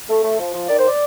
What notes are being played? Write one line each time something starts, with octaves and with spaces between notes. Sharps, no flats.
A3
A3
F3
F3
D#3 D5
C5
D5